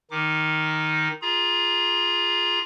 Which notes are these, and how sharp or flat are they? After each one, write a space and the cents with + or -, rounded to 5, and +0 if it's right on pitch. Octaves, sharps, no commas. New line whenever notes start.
D#3 +0 D#4 +0 D6 +0
F4 +0 G#4 +0 A#5 +30